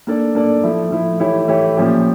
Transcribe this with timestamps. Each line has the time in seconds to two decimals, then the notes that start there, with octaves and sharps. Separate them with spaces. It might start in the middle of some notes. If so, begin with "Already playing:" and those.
0.07 A#3 D4 A4 D5
0.35 A#3 D4 A4 D5
0.63 F3 A3 E4
0.91 F3 A3 E4
1.20 E3 A3 E4 G4 C#5
1.48 E3 A3 E4 G4 C#5
1.76 A#2 F3 C#4 G4